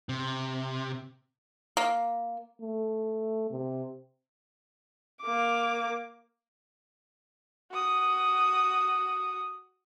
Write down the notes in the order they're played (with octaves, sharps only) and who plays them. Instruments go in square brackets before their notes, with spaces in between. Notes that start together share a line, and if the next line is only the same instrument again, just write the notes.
[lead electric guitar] C3
[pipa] A#3
[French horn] A3
C3
[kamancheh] A#3 D6
F#4 D#6